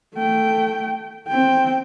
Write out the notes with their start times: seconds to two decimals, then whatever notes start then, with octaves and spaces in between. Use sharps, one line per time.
0.15 A3 G5
1.28 C4 G5